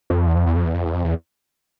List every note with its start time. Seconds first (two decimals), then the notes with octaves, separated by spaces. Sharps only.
0.10 F2
0.27 E2
0.35 F2
0.46 E2
0.56 F2
0.65 E2
0.74 F2
0.85 E2
0.94 F2
1.05 E2